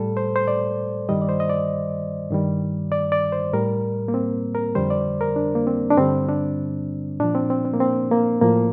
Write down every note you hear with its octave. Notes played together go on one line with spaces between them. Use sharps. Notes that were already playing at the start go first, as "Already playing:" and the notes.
Already playing: A2 G3 A4
C5
C5
D5
G2 D#3 G3 D#5
D5
C5
D#5
D5
G2 D#3 G3
D5
D5
C5
A2 G3 A#4
A#3
C4
A#4
F2 D3 G3 C5
D5
A#4
D4
A#3
C4
D4
G2 D3 G3 C4
D4
A#2 F3 D4
C4
C4
C4
A#3
C4
A#3
A2 F3 A#3